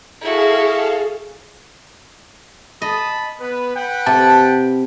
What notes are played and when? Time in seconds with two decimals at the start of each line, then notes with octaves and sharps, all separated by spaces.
0.21 E4 F#4 G#4 A4 F5
2.82 D#5 A5 B5 D#6
3.40 B3 B4
3.75 B4 F#5 G5
4.06 C3 A5